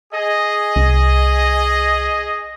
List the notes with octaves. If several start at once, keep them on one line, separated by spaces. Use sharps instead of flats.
G#4 D#5
C2